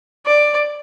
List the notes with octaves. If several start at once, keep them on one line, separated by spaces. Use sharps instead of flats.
D5